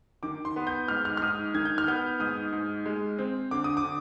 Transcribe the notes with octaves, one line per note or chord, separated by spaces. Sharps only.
D#3 D6
C6
B3
G6
G#2 F6
F6
F6
G#2 D#6
D#3 G#6
G6
F6
B3 G6
G#2 D#6
G#2
G#3
C4
D3 D6
D#6
D6
D3